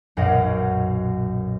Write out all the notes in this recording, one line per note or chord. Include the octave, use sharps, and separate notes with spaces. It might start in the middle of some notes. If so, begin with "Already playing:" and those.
B1 F#2 A#2 A#4 D#5 F#5